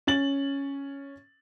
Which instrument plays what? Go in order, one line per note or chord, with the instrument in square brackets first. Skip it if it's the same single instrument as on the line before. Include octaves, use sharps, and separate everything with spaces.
[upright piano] C#4 A6 F#7